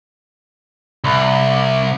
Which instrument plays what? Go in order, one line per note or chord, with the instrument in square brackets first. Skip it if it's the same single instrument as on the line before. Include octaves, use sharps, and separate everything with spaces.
[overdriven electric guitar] C2